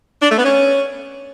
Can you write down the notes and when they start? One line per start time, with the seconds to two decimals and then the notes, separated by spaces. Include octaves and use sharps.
0.21 D4
0.29 A3
0.37 B3
0.44 C#4